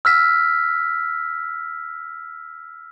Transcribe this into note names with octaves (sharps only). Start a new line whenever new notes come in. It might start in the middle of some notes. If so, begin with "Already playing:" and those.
E6 F6 B6